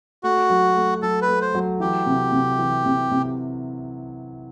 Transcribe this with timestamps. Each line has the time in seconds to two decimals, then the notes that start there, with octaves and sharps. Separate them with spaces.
0.23 A3 F#4
0.50 F#3
0.76 A3
1.02 F#3 A4
1.22 B4
1.28 A3
1.42 C5
1.55 F#3
1.80 E3 G4
2.06 C3
2.32 C3
2.59 E3
2.86 C3
3.11 C3